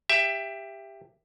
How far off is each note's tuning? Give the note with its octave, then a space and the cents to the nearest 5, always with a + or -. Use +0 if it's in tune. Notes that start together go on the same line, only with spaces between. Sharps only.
G4 +15 E5 +15